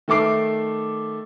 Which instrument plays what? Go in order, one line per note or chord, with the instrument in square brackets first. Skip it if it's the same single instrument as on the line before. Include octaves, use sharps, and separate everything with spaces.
[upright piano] D#3 A3 A4 D6 C7